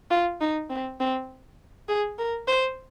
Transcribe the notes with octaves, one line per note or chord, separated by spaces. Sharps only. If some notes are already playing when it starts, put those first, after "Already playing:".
F4
D#4
C4
C4
G#4
A#4
C5